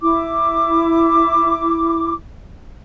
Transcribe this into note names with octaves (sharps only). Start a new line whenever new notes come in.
E4 D6